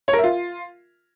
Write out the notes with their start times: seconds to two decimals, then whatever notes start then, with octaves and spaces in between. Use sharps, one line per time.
0.08 C#5
0.13 A#4
0.18 E5
0.24 F4